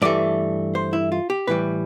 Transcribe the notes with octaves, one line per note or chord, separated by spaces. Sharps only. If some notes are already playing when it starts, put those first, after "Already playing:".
G2 E3 A3 D5
C5
E4
F4
G4
A2 E3 G3 B4